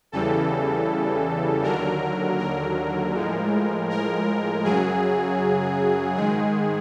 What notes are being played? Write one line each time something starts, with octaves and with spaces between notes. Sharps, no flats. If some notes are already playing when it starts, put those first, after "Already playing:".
E2 C#3 E3 G3 A4
D#2 D3 F#3 A#4
A#4
A2 F3 G#3
A#4
F#2 C#3 F#3 G#4
G#2 D#3 G#3 G#4